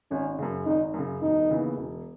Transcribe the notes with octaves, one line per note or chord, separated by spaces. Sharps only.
G#1 C#4
F#2 C#3
G#1 D#4
F#2 C#3
E1 D#4
D#2 C#3 E3 B3
E1